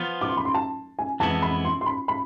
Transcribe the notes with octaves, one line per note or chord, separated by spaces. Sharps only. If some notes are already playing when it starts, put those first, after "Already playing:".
Already playing: F3 B3 F4
D6
C6
B5
C6
A5
G#5
F2 E3 G#3 B3 E4 A5
B5
C6
C6
B5
B5